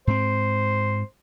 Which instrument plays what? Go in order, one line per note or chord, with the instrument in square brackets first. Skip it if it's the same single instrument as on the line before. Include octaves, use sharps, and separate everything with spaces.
[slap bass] G#2 C4 [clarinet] C5